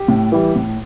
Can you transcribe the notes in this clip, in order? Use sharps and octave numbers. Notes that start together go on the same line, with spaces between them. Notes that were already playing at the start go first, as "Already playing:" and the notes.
Already playing: G4
A2
E3 G3
A2